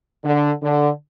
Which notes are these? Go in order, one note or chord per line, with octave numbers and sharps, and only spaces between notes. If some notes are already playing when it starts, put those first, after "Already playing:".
D3
D3